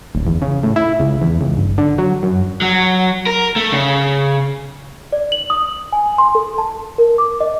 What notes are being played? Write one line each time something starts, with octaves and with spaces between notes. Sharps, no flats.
D1
E2
C#3
A2
E4
C#2
E2
C#2
G1
D3
F#3
F#2
F#3
A#4
A3
C#3
D5
F#7
D#6
G#5
C6
A4
A5
A#4
D6
D#5